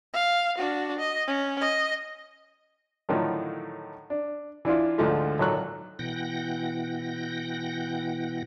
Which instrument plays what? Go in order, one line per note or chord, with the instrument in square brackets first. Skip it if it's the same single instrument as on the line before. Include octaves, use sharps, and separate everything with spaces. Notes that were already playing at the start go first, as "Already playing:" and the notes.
[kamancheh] F5
D4 F#4
D#5
C#4
D#5
[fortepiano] A2 D3 D#3 F3 F#3
D4
E3 D4 E4 F4
D2 G#2 D3 F3 A3
G#1 A#2 F#3 A4 C#6 F#6
[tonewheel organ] B2 E3 F#5 G5 A#6